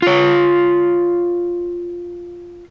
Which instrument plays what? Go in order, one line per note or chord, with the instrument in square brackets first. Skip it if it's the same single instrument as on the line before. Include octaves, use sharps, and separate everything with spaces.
[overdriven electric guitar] F4 C#5